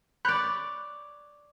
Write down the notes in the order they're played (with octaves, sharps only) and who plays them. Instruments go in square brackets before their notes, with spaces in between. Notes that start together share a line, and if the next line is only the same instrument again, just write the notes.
[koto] C#5 D5 [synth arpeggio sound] B5 F#6 G6